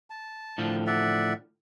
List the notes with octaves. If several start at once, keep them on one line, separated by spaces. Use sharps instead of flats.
A5
A2 D3 F3
D5 E5 F#5